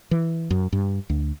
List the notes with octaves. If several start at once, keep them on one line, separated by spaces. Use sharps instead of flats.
E3
F#2
G2
D2